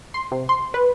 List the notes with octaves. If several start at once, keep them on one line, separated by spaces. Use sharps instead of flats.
C6
C3
C6
B4